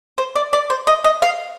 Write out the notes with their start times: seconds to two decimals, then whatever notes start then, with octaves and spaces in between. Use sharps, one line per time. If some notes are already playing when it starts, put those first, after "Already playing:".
0.18 C5
0.36 D5
0.53 D5
0.70 C5
0.87 D#5
1.04 D#5
1.22 F5